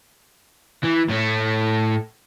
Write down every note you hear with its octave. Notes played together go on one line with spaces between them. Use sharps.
E3
A2 A3